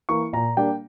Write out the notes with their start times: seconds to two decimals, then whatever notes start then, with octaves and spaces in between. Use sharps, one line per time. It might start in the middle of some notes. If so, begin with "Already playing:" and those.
0.09 E3 A#3 E4 C#6
0.33 A#2 A#5
0.57 G3 A#3 D4 G5